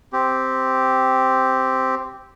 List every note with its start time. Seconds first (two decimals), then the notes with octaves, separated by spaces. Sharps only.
0.13 C4 G4